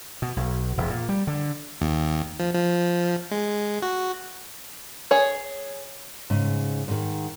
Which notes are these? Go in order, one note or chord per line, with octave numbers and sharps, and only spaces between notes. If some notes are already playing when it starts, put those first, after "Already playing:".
B2
B1
E1
A#2
G3
D3
D#2
F3
F3
G#3
F#4
G#4 C#5
G#2 C#3
G#2 D#3